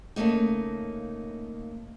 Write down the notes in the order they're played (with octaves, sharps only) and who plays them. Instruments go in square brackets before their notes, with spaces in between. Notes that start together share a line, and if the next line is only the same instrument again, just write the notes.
[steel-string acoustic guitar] C#3 F3 A3 A#3 D#4